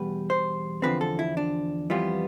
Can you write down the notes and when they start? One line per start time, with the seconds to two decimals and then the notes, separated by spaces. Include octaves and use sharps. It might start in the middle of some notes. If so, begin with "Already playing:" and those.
Already playing: E2 B2 G3 B4
0.30 C5
0.82 E2 D3 F3 C4 B4
1.01 A4
1.19 E4
1.37 D4
1.90 F2 E3 G3 B3 F4